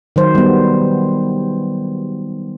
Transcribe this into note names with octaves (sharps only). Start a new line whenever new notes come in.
D#3 F#3 C5
G3 B3